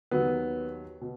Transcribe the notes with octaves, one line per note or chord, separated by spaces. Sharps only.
D#2 D#3 F#3 B3
B2